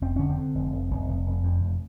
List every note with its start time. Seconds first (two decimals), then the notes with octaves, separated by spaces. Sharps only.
0.02 F1 C4
0.16 D3 C#4
0.30 C4
0.38 D3
0.55 F1
0.73 F1
0.90 F1
1.08 F1
1.26 F1
1.44 F2
1.61 F1